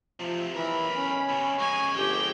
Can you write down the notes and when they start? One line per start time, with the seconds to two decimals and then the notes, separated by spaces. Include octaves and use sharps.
0.20 C3 F3 A3
0.55 B1 E3 A#4 B5
0.95 C#4
1.29 C3 B3
1.59 F3 G#3 G#5 C#6
1.96 G1 G4 G5